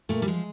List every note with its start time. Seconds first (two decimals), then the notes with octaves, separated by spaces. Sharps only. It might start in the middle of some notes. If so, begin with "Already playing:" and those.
0.09 A#2 A3
0.22 G3
0.27 F3 G#3